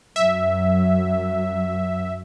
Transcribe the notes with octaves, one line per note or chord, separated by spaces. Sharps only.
F#2 F#3 E5